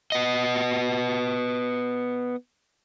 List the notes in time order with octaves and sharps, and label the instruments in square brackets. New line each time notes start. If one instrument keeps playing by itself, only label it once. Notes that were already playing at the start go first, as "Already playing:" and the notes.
[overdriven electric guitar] B3 D#5